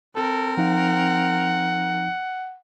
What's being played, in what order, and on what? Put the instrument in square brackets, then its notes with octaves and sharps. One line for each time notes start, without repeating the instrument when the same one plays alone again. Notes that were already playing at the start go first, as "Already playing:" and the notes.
[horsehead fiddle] C4 A#4 [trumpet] A4
[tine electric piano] F3 D#4 F5 [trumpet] F#5